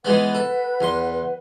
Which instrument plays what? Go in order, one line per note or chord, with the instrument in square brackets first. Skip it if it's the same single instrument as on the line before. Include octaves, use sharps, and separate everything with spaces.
[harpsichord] E3 G#3 B3 [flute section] B4 F#5
[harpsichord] A4
E2 C6